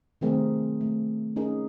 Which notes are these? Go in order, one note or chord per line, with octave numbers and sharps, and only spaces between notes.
D#3 F#3 A3 C4 G#4 A#4
A3
C#4 D#4 G#4 A#4